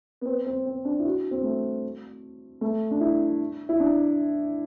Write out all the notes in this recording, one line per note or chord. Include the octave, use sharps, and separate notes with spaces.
B3
C4
C4
C4
D4
E4
F#4
C4
A3
A3
D4
E4
E4
D4